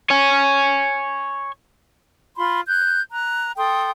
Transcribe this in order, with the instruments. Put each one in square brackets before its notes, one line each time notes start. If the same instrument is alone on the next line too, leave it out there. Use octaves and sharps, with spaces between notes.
[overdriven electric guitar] C#5 G#5
[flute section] F4 B5 C6
F#6 G6
A#5 F#6
A4 G5 C6 D#6